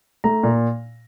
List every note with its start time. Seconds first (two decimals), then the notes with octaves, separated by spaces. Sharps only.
0.24 A3 A#5
0.43 A#2